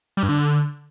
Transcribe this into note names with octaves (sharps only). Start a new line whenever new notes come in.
G3
G2
D3